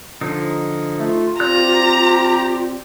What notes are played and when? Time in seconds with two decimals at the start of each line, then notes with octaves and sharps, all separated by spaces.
0.21 D3 F3 D#4
0.99 A3 F4
1.40 C4 G4 D5 A#5 F#6